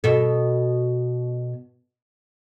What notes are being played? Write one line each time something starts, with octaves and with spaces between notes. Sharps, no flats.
B2 A4